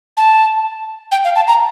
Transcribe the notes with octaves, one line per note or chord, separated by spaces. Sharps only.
A5
G5
F5
A5
A#5